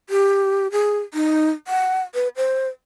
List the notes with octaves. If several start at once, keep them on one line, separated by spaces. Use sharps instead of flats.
G4
G#4
D#4
F#5
B4
C5